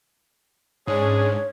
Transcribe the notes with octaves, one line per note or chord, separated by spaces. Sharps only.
G#2 G#3 C#4 D4 G#4 C#5